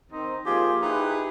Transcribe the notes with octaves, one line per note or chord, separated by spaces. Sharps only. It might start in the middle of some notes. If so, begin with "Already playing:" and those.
D#3 C4 D#4
F3 A#3 F4 G4 G#4 C5
D#4 E4 G4 G#4 B4